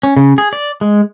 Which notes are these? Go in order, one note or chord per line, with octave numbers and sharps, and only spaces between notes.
C#4
C#3
G#4
D5
G#3